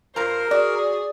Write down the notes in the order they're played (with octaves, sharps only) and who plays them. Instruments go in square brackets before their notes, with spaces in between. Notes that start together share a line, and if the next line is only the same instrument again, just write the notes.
[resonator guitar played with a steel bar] G2 F4 A#5 [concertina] A#4 [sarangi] C5
[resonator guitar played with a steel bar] F#4 [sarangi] G#4 [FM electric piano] D5